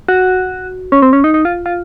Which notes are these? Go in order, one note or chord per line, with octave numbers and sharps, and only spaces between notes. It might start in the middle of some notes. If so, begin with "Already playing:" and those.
F#4
C#4
C4
C#4
D#4
D#4
F4
F4